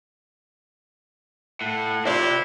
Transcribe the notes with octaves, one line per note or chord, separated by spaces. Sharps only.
A2 F#5
C4 E4 F4 G4 D5 E5